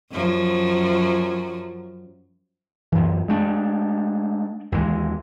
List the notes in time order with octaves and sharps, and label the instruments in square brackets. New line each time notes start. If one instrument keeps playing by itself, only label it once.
[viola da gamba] F#2 F3 F#3
[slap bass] F#2 E3
G#3 A3 D4
D#2 E3 G#3